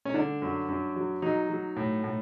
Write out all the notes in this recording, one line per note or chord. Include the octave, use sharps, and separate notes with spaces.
C#4
D3 D4
F#2
F#2
F#3
F#3 D#4
F#3
A2
A2